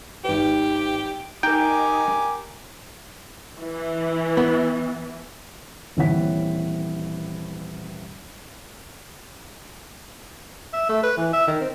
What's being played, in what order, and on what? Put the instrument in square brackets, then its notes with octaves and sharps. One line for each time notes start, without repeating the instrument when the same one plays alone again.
[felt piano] G#1 B4 [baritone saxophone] G4
[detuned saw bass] D#4 [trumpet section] G4 G#5 D6 [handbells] A#4 A#5 [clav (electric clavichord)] G5
[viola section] E3
[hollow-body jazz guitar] B3
[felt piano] D#1 E3 C4 C#5 F#5 B6
[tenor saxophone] E5
A3
B4
E3
E5
D#3
C4